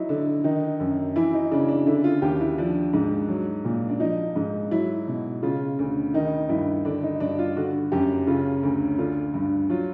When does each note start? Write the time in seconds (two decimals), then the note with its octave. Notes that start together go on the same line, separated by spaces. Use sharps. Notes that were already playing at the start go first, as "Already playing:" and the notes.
Already playing: F#3 D#4 E4
0.09 D3
0.44 D#3 D#4
0.80 F#2
1.16 E3 E4
1.34 D#4
1.51 C#3 D4
1.69 D4
1.86 D3 E4
2.04 F4
2.22 D#2 G4
2.40 E4
2.58 F3 D4
2.93 G#2
3.29 F#3
3.65 A#2
3.89 D4
4.00 F3 D#4
4.36 G#2
4.71 F#3 E4
5.08 B2
5.43 C#3 F4
5.79 D2
6.14 D#3 D#4
6.49 G2 E4
6.85 D3 D4
7.03 D#4
7.20 G2 D4
7.39 F4
7.56 D3 F#4
7.92 F#2 G4
8.27 C#3 F4
8.63 D2
8.98 D3 F4
9.34 G2
9.70 F#3 F4